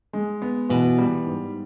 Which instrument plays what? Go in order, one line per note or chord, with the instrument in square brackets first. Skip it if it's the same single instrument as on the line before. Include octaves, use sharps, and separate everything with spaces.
[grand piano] G#3
B3
[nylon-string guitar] B2 [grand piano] E3
[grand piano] G3
G#2